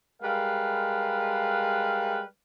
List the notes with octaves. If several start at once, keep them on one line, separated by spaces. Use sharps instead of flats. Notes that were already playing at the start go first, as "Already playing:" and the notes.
G3 G#3 A#4 B4 F5